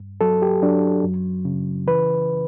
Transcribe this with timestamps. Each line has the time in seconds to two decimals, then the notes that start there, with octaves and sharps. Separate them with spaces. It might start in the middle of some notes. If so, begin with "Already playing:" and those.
Already playing: G2
0.21 F#3 A4
0.42 G4
0.62 F#3 D4
1.04 F#2
1.45 C#3
1.87 E3 B4